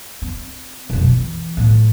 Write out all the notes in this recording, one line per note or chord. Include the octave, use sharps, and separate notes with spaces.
C4
F1 B1
E3
A2 F3